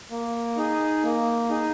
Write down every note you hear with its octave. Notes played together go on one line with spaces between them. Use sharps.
A#3
D#4 G#4
A#3
D#4 G#4